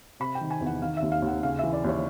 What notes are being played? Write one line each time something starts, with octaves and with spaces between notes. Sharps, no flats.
C3 B5
G5
D#3
G#5
E2
F#5
D#3 F5
E5
D#2
F5
D#2
F#5
C#3 F5
E3 E5
D5
D#2 C#5